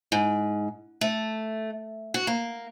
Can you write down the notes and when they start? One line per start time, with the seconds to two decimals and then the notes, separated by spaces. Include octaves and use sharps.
0.12 G#2
1.01 A3
2.14 F#4
2.27 A#3